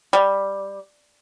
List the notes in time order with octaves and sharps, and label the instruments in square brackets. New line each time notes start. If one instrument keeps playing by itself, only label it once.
[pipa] G3